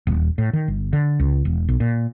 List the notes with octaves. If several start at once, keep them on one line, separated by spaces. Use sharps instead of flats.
D#1
A2
D#3
G1
D3
C#2
E1
B1
A#2